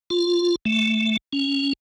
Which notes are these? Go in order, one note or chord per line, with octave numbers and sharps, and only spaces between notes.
F4
A3
C#4